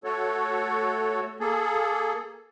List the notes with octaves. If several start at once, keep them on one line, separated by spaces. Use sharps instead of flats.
A3 F#4 A4 C#5
A#3 G#4 A4